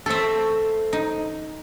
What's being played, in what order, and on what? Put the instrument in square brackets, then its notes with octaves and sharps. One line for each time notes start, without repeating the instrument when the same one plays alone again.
[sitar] A3 C4 [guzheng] A4 E5
[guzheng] D#4